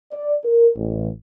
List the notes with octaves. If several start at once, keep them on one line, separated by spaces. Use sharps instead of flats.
D5
A#4
A1